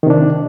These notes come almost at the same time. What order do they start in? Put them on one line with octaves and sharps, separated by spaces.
D#3 C3 D4